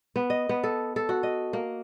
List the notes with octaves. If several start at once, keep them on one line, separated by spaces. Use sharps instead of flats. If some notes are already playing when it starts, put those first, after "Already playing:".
B3
D#5
B3
A4
A4
F#4
D#5
A#3